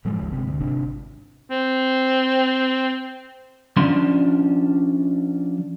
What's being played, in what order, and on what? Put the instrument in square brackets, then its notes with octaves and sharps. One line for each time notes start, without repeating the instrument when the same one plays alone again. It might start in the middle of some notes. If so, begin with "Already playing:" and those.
[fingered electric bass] A2 F3 G#3
G#1 D2 C#3 G#3
G1 C3
D2
G#1 C3 D4
[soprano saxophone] C4
[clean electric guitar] F3 C#4 D4 C6